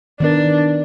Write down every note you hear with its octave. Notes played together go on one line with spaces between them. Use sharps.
D#3 B3 D4 A#4